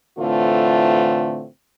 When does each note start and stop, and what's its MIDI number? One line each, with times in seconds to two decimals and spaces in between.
0.18 1.47 45
0.18 1.47 50
0.18 1.47 52
0.18 1.47 57
0.18 1.47 60
0.18 1.47 65